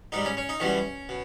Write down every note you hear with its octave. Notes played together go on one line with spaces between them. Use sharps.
G#2 G3 D#4
C#4
C#4
D#4
E2 B2 G3 C#4
B2